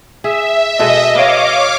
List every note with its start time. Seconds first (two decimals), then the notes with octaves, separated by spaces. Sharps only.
0.24 G#4 E5
0.79 B2 G#3 A4 D#5
1.15 B3 C#5 F5 D6